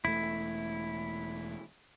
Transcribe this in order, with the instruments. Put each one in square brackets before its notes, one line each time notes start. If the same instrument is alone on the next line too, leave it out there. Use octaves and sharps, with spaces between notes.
[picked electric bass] E1 A3 [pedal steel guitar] E4